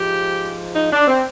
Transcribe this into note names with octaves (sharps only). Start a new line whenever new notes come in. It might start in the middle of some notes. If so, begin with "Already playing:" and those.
Already playing: G#2 F3 G4
D#4
D4
C4